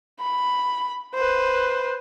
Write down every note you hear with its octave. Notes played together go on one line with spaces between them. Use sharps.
B5
B4 C5